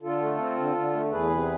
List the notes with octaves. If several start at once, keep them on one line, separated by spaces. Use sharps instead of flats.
D3 F4 A4
A3
C4
D3
D3
A3
E2 G#4 B4
C3